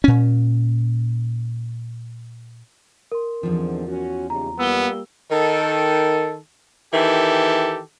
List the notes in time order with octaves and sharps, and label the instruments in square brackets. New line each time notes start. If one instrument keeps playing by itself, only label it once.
[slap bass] A#2 C#4
[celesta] A#4 C6
[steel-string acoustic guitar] E2 F3 [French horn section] G#2 D3 C4
[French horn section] C#4 F#4
[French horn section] D#2 C#3 G3 [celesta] A#5
[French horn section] G3 A#3 F4 [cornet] B3 [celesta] E6 G7
[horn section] D#3 A4
D#3 E3 G4 A4